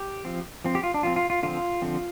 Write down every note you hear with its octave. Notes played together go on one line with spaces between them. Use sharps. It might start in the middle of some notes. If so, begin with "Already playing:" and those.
Already playing: G4
F3 C4
F3 C4
G4
F4
D4
F3 C4 F4
F4
F4
D3 F3 C4 F4
D3 F3 C4